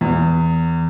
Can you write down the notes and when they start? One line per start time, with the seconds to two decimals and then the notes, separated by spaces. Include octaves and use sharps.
0.01 E2